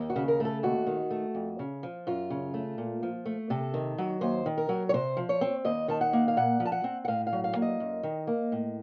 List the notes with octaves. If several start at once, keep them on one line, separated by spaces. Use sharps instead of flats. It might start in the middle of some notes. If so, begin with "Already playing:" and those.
Already playing: D#2
F#4
C#3
A#4
A3 A4
D#2 F#4
D#3
A3
F2
C#3
F3
F#2 F4
C#3
A3
A#2
F3
A3
C3 A4
D#3
F#3
D#2 C5
D#3
A#4
F#3
C#5
C3 C5
F3
C#5
C4
D#2 D#5
D#3 A5
F#5
A#3
F5
A#2 F#5
F3
A5
F#5
C4
F#5
A2 F5
F5
F#3
F5
A#3
D#5
F#2
D#3
A#3
A2